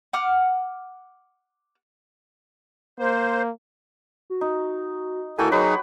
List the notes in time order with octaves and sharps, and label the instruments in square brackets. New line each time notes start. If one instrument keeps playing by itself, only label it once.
[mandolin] F#5 D6 F6
[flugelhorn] A#3 [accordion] C5
[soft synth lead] F#4
[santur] D#4
[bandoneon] D2 A4 G#5 [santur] A#3 F#4 G5 [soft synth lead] E4
[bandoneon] F#3 D#4 G#4 [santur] B4 [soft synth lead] C#5